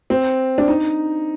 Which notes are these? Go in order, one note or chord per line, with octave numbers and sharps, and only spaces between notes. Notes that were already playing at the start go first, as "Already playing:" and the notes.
C4
D4
D#4